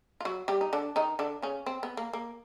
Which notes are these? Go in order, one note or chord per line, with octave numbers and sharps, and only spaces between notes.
F4
F#3 F#4
G3 G4
D#4
D3 D4
D#3 D#4
D3 D4
C#3 C#4
C4
B3
A#3
A#3